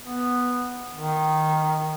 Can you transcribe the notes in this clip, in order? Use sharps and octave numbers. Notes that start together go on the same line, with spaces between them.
B3
D#3